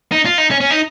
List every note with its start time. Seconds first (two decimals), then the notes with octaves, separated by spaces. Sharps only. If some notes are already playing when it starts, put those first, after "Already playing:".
0.12 D#4
0.26 F4
0.38 D#4
0.51 C#4
0.61 C#4
0.71 D#4